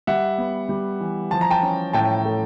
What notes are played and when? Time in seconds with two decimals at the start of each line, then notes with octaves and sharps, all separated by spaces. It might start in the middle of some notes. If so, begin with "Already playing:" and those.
0.07 G3 E5 F#5
0.38 B3
0.69 G3
1.00 E3
1.31 F3 A5
1.41 A#5
1.51 G5 A5
1.63 C#4
1.93 A2 G5 A5
2.25 A3